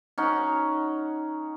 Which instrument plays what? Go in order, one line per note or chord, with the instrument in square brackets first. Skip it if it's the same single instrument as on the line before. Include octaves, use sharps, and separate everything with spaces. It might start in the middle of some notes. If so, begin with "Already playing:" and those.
[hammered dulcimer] C#4 D#4 F#5